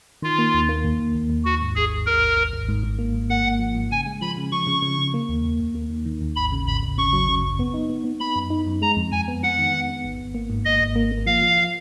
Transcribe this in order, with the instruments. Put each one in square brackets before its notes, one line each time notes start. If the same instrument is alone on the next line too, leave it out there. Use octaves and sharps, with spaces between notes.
[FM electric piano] D#3 [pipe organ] F4
[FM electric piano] A#3
D#2
A#3
D#2
D#2
D#2
D#2
[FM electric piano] D#3 [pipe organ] F#4
[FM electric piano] G#2
[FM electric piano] G#1 [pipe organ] G#4
[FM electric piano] G#1
[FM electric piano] G#1 [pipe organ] A#4
[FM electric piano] G#1
G#1
G#1
G#2
G#2
A#3
G#2
[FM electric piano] A#3 [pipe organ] F#5
[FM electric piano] G#2
F3
G#2
[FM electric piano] C#3 [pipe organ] G#5
[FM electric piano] G#3
[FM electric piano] F3 [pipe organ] B5
[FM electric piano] C#3
[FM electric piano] F3 [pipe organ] C#6
[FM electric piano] C#3
C#3
C#3
A#3
D#2
D#2
D#2
A#3
D#3
D#3
D#2
[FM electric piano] G#1 [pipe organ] B5
[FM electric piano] C#3
[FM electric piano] G#1 [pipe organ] B5
[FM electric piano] G#1
[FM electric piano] C#3 [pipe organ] C#6
[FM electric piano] F#3
C#3
F#2
B3
D#4
B3
B3
[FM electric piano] B3 [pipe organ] B5
[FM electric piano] F#2
D#4
F#2
[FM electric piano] G#3 [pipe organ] A#5
[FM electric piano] F2
[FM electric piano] F2 [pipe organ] G#5
[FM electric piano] B3
[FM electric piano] B3 [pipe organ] F#5
[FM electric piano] D#3
D#3
B3
G#1
G#1
A#3
G#2
[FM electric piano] G#1 [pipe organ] D#5
[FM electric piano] G#1
A#3
A#3
[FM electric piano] F3 [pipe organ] F5
[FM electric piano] F3
F3